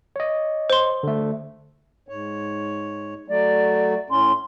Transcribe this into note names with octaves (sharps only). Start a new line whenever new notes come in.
C#5 D#5
C5 C6
D3 A3
G#2 C#5
F#3 A3 D5
A2 C#4 C6